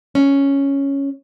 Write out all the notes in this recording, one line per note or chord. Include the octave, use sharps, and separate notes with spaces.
C#4